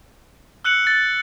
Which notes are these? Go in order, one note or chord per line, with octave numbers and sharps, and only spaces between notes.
E6 F#6 C#7 F#7
A6